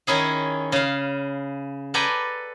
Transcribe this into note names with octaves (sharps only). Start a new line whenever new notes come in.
D#3 C#4 E4 G#4
C#3 F5
A4 B4 D5 G5 G#5 A#5